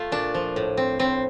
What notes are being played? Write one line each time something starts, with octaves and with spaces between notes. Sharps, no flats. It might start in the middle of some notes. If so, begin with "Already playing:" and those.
Already playing: A3 F4
A#2 D4
F3
A2
C4
A2 C4